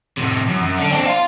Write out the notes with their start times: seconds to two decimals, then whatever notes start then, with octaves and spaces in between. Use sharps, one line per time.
0.18 A2 C3
0.49 F#2
0.63 F#2
0.79 D3 D4
0.91 C4 D4
1.07 F5 C6